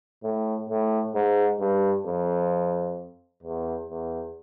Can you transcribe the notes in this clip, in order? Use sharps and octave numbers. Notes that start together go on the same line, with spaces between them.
A2
A2
G#2
G2
F2
E2
E2